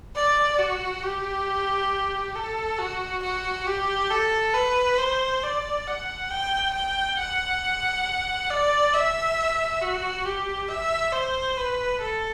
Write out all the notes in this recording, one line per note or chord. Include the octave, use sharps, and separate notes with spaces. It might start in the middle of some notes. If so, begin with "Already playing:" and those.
D5
F#4
G4
A4
F#4
F#4
G4
A4
B4
C5
D5
F#5
G5
G5
F#5
D5
E5
F#4
G4
E5
C5
B4
A4